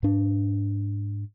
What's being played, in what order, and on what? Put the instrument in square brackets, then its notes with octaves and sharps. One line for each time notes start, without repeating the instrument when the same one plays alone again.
[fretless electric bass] G#2 D4